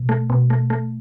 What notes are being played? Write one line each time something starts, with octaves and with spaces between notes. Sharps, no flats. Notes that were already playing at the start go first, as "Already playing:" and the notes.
Already playing: B2
A3
B2
A3
A3